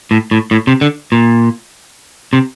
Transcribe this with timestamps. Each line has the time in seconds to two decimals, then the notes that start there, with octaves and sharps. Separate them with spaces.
0.11 A2
0.31 A2
0.51 A2
0.67 C3
0.81 D3
1.12 A#2
2.33 C3